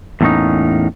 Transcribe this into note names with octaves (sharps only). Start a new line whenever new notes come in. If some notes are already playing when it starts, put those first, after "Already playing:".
E2 A2 A#3 C#4 D#4